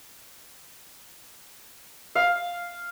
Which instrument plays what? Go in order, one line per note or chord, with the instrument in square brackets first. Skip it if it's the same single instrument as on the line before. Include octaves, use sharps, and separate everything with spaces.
[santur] F5